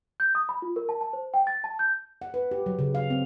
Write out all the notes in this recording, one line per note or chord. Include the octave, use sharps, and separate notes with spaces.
G6
D#6
B5
F4
A#4
A5
A5
C5
G5
A6
A5
G6
F#5
B4
G4
F#3
C#3
F5
C4